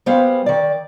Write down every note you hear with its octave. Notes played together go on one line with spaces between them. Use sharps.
G3 B3 G#4 C5 F5
D#3 D5